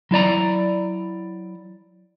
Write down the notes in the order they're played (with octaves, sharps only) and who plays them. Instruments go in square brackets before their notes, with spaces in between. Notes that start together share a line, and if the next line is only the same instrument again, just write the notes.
[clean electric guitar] F#3 E4 D5 A#5